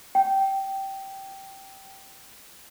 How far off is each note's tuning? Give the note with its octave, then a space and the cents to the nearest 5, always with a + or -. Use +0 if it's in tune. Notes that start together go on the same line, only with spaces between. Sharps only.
G5 -10